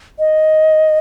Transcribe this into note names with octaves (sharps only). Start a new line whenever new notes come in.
D#5